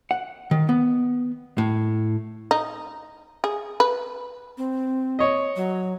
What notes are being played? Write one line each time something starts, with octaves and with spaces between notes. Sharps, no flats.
F#5
D#3
B3
A2
D#4
G#4
B4
C4
C#5 D#5
F#3